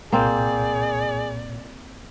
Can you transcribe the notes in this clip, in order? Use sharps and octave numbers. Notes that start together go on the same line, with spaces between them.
C2 A#2 A#3 C4 G#4 D5 G6